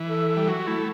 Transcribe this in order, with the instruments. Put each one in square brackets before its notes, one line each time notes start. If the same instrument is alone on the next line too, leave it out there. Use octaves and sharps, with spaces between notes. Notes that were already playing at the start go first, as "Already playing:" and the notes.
Already playing: [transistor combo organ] E3
[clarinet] A4
A4
[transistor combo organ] G3
[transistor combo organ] F#3 [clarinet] F#4
[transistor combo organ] A3 [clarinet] E4